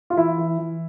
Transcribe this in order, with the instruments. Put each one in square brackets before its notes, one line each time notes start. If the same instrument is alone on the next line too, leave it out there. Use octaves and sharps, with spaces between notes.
[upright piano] F4
E3 E4
E3
E3